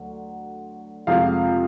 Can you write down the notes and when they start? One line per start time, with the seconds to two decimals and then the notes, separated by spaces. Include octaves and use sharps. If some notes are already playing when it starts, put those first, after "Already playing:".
Already playing: D2 D3 F#3
1.07 F2 C3 F3 G#3 F5